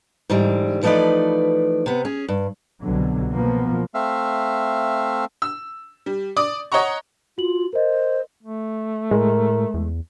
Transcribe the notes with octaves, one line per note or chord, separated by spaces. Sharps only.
G#2 D3 E3 G3
E3 F3 A3 D#4 B4 D5
C3 B3
C#4 G#4
G2
C2 B2 D3 F#3
B2 F3 A#3 B3
A3 C4 E5 F5
E6
G3
D5 D6 D#6
C#5 D#5 F#5 A#5 C#6
F4 F#4 F#7
A#4 C5 D#5
A3
A2 G#3 A#4
E2